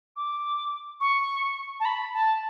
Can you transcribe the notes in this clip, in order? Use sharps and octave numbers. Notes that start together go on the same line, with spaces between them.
D6
C#6
A5
B5
A5